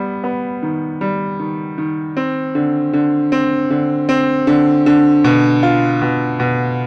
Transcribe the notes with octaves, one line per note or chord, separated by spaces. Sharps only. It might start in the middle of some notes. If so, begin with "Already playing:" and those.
Already playing: G3 B3
B3
D#3
G3
D#3
D#3
C4
D3
D3
C4
D3
C4
D3
D3
B2
F4
B2
B2